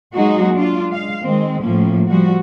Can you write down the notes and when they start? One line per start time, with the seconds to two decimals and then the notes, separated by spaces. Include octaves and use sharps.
0.14 F#3 G#3 A#3 D#4 F#4 G#4
0.55 D4 F4
0.88 G#3 F5
1.23 D#3 G#3 C4
1.61 A2 F3 A#3 C#4
2.07 F3 G3 F#4